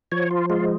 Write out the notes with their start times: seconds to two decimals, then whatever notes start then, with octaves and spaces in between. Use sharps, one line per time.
0.12 F3 C#5
0.31 F4
0.50 G#3 F4